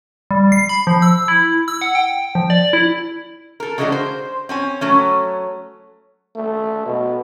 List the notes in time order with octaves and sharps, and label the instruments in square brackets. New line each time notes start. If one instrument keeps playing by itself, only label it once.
[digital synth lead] G3
C7
B5
F3
E6
E4
E6
F#5
G5
F3
D5
E4
[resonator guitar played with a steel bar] A4 A#4
C#3 E3 G#3 A3 D4 F#4
C5
C4 C#4 G#5
F#3 A3 C#4
[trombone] A3
B2